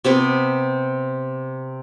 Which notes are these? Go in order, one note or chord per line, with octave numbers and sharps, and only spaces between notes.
C3 B3 B4